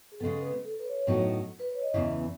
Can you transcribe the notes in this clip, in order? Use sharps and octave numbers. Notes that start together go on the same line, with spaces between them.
G#4
C#3 G#3 B3 A4
B4
A4
B4
C#5
A2 F#3 B3 D#4 F#4
B4
C#5
D#5
E2 C#3 E3 E5